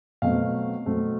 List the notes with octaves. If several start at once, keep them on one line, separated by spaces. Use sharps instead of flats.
B2 F#3 A3 C4 F5
B2 F#3 A3 C4